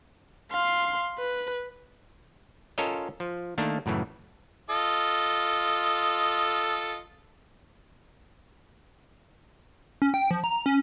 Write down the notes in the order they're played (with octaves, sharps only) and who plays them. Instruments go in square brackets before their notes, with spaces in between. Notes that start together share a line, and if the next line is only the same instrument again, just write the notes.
[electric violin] F5 C6
B4
[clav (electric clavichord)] C#4 F4 A4 A#4 C#5 D#5
F3
D#3 A3 A#3 D4
F#2 A2 C#3 E3
[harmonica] F4 A4 D#5
[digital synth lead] C#4
G5
F3
A#5
C#4